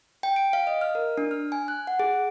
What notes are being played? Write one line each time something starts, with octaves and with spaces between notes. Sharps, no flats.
G5
D7
F5
D#5
F6
A#4
D4
F6
G#5
F#6
F#5
G#4